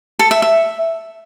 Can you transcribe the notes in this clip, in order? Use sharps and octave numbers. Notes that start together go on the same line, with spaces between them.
A4
E5
E5